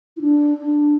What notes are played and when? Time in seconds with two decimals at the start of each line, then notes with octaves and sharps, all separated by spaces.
0.17 E4
0.21 D4
0.58 D4